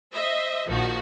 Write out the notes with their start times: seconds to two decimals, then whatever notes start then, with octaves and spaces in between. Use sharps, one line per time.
0.13 C5 D#5 E5
0.67 A#1 A#2 D#3 F3 F#4 A5